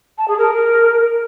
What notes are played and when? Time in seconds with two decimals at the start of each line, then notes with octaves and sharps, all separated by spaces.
0.18 A5
0.28 G#4
0.38 A#4